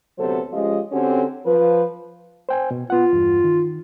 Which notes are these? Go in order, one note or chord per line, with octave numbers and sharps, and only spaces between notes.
D2 C3 F#3 B3 A4 C5
F3 G#3 C#4 F4 G4 D#5
D3 C4 C#4 F#4 G4 A4
F3 B4
C5 G5 G#5
B2
B3 F4 F#5
E2 G2
D#3